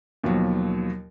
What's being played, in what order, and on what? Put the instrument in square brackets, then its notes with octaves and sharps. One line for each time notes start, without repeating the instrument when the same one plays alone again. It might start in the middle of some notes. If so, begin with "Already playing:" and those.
[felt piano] D#2 B2 F3 F#3